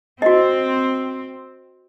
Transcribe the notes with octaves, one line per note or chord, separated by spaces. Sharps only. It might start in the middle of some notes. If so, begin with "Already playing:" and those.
C4 F#4 D#5